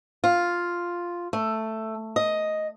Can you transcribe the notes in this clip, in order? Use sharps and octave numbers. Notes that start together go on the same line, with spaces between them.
F4
A3
D#5